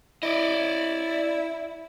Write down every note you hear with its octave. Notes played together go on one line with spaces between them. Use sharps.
E4 D5 D#5